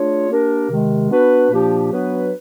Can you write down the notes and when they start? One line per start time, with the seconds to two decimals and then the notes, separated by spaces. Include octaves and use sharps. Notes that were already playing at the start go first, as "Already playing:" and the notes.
Already playing: A3 D4 F4 G#4 C#5
0.29 A#3 D4 G4 A#4
0.70 C3 D#3 G#3
1.09 B3 D4 F#4 B4
1.51 A#2 F3 A#3 D4 G4
1.91 F#3 B3 D4 F#4 B4